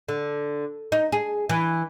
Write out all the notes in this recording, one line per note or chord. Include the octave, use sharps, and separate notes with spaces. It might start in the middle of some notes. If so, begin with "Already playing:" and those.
D3
D#4
G#4
E3